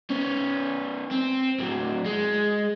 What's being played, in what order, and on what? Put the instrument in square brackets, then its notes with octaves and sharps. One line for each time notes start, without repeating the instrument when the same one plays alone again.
[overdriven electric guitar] B3 C#4
C4
A2 F#3
G#3